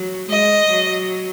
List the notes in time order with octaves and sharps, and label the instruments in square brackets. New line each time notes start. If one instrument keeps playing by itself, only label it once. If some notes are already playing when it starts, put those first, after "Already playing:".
Already playing: [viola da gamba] F#3
[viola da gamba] G#3 [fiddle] D#5
[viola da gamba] F#3